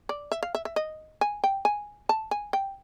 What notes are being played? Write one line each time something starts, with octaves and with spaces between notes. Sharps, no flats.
D5
E5
F5
E5
E5
D#5
G#5
G5
G#5
A5
G#5
G5